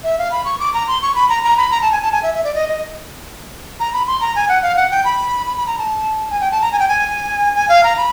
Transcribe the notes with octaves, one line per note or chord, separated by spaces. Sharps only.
E5
F5
B5
C#6
D6
A#5
C6
C#6
B5
A#5
A#5
B5
A#5
A5
G#5
A5
G#5
E5
E5
D5
D#5
D#5
A#5
B5
C6
A#5
G#5
F#5
F5
F#5
G5
B5
B5
B5
A#5
A5
G#5
G5
A5
A#5
G#5
G5
G#5
G#5
F5
A#5
B5